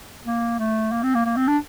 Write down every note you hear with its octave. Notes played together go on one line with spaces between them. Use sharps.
A#3
A3
A#3
C4
A#3
A#3
C4
D4